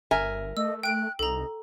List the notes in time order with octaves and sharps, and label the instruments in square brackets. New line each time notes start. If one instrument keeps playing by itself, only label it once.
[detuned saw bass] G1 [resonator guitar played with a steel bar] A#4 E5 G#5
[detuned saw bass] A3 [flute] D#5 [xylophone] E6
[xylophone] G5 D7 [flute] F#6
[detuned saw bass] C2 [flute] D#4 [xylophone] A4 A#5